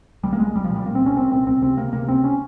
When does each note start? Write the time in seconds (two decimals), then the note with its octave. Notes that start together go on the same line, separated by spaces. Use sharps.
0.23 C2 G3
0.33 A#3
0.39 C2 G#3
0.55 C2 G3
0.64 F3
0.70 A#2
0.76 G3
0.85 A#2 A#3
0.95 C4
1.01 C2
1.06 C#4
1.16 A#2 C4
1.31 C2 C4
1.46 C#2 C4
1.62 C3 C4
1.77 C#2 A#3
1.93 C3 A#3
2.08 C#2 C4
2.24 C#4